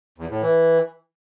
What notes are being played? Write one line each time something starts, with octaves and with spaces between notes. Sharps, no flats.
E2
A2
E3